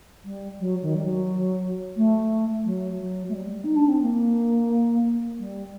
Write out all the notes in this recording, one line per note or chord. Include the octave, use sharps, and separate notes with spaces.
G3
F#3
D#3
G3
F#3
A3
F#3
F#3
A3
G3
D#4
D4
C4
A#3
G3